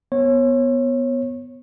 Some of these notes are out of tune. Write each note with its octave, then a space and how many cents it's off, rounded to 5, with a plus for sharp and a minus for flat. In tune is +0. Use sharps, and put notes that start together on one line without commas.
B3 +0 C#5 -25